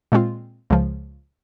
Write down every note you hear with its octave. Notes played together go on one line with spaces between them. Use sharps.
A#2 G#3 C4 F4
C#2 C#3 F3